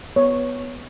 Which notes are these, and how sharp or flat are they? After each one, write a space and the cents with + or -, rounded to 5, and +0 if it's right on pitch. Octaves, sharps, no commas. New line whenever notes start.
B3 +0 C#5 +0